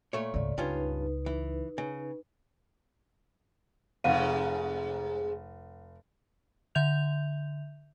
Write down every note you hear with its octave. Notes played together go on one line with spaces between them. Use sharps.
A#2 A3 C#5
C#2 G#2 D5
C#2 G2 C#4 D#4 F4 B4
E3
C#3
F1 G#2 C3 F5 F#5 D#7
D3 E5 G6 F7